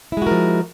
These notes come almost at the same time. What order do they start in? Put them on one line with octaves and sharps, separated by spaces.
E4 G#3 F#4 A#4 F3